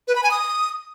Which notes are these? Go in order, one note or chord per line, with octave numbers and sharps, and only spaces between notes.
B4
B5
G#5
D#6